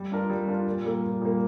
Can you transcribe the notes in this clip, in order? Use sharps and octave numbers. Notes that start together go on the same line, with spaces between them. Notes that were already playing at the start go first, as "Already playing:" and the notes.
Already playing: G3
D4 F4 A#4 D5
G3
D4 F4 A#4 D5
A#2
G3 A#3
A#2
G3 A#3